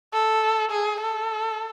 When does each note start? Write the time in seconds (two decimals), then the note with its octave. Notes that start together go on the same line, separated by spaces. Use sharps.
0.13 A4
0.71 G#4
1.01 A4